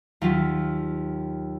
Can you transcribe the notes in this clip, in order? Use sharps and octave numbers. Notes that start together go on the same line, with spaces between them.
D#2 F#3 F4 B6